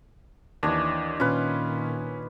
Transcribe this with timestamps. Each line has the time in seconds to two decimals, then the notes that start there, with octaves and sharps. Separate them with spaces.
0.63 D#2 E3 D4 C#5 D#5
1.20 A#2 D#3 C#4 F4 B4